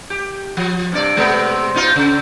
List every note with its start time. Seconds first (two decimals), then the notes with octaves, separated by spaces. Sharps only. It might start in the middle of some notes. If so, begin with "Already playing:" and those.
0.10 G4
0.57 F3
0.92 G2 C3 D5
1.16 C3 G#3 B3
1.74 B2 D#4 F4
1.96 C#3